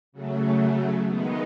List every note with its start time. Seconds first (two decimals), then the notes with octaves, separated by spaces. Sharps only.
0.12 C#3 F#3 A3
1.05 D#3 G#3 B3 D#4